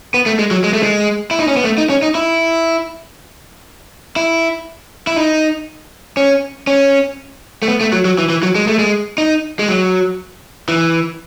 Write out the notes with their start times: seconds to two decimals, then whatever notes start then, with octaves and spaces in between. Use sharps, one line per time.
0.14 B3
0.26 A3
0.39 G#3
0.51 F#3
0.64 G#3
0.73 A3
0.83 G#3
1.31 E4
1.40 D#4
1.48 C#4
1.57 B3
1.64 A3
1.78 D#4
1.90 C#4
2.03 D#4
2.15 E4
4.16 E4
5.07 E4
5.16 D#4
6.17 C#4
6.67 C#4
7.62 A3
7.68 B3
7.81 A3
7.93 F#3
8.05 F#3
8.18 E3
8.30 E3
8.43 F#3
8.55 G#3
8.67 A3
8.79 G#3
9.18 D#4
9.59 G#3
9.69 F#3
10.68 E3